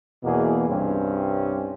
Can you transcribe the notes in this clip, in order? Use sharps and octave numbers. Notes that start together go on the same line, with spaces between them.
E2 B2 A#3 G#4
C2 G2 C4 C#4